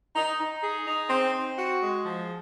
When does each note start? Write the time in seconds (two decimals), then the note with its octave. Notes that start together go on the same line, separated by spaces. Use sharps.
0.16 D#4
0.39 D#4
0.62 G#4
0.86 D#4
1.10 C4
1.34 C4
1.58 F#4
1.81 G#3
2.05 F3